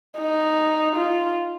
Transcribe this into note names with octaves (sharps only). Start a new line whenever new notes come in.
D#4
F4